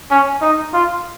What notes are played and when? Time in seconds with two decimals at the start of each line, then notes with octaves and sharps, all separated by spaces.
0.11 C#4
0.42 D#4
0.73 F4